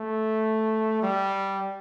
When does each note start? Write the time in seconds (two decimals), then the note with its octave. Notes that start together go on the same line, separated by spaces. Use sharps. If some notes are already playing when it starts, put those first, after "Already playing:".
Already playing: A3
1.02 G3